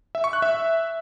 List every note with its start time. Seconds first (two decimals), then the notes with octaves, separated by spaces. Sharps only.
0.15 E5
0.24 C#6
0.33 F#6
0.42 E5